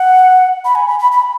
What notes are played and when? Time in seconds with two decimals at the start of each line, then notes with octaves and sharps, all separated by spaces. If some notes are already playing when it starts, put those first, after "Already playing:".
Already playing: F#5
0.65 B5
0.75 G#5
0.88 B5
0.99 B5
1.12 B5